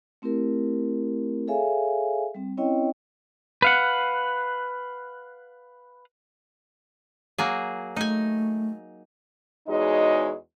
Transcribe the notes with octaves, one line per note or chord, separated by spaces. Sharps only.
A3 C4 E4 G4 A#4
G#4 A4 C#5 E5 F5 G#5
G3 C4
C4 C#4 E4 C#5 D#5 G5
B4 F5 F#5
F#3 A#3 G#4
A3 D#4 G#5
E2 G#3 D#4 F#4 C#5 D#5